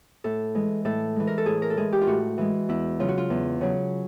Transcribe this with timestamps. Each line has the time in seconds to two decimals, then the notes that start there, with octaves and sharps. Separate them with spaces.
0.24 A2 A4
0.55 E3 G#3
0.85 A2 A4
1.16 E3 G#3
1.27 A#4
1.38 A4
1.46 A2 G#4
1.62 A#4
1.70 A4
1.77 E3 G#3 G#4
1.93 G4
2.01 F4
2.07 A2 F#4
2.38 E3 G#3
2.69 E2 E4
2.99 C#3 F#3 F4
3.09 F#4
3.18 F4
3.30 E2
3.61 C#3 F#3